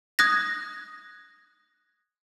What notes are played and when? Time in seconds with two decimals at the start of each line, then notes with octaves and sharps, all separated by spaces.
0.19 D#6 F#6 G#6 A#6